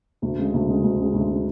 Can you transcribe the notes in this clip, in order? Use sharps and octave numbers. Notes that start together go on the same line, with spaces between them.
D2
C#3 G#3
D2
C#3 G#3
D2
C#3 G#3
D2
C#3 G#3